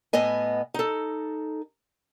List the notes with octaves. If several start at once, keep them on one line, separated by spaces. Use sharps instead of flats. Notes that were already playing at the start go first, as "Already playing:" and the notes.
A2 B3 D#5 G#5
D#4 A4